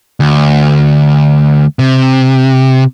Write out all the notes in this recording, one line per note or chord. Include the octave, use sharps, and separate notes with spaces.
D2
C3